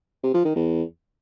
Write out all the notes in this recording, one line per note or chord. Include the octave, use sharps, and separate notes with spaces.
C3
F3
D#3
E2